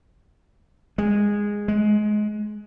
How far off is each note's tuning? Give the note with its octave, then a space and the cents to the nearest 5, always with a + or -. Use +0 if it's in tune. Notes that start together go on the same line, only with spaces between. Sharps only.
G#3 -10
G#3 +20